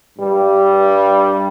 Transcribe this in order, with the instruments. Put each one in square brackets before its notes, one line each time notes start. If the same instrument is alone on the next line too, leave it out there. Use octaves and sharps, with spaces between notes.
[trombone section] G2 G3